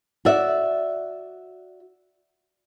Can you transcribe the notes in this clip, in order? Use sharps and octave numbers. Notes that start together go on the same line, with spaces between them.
F#4 D5 E5